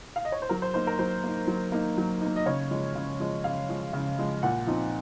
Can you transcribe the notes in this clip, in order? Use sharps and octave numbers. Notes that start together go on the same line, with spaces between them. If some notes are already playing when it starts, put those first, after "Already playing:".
F5
D#5
C#5
C5
F#3 A#4
C5
A#3 D#4 C5
A#4
F#3 C5
A#3 D#4
F#3
A#3 D#4
F#3
A#3 D#4
D#5
C#3 C#5
F3 G#3
C#3
F3 G#3
C#3 F5
F3 G#3
C#3
F3 G#3
A#2 F#5
F3 C4 D#4